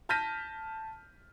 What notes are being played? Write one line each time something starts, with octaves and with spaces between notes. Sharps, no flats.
A5 F6 G6 A#6 B6 D#7